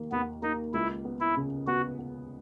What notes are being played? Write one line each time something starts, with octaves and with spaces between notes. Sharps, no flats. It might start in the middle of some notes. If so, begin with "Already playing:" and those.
Already playing: D#2 D#3 A#3
D#2 B3
A#3 D#4
C#2 E4
B3
E4
C#3
B3 F#4
B3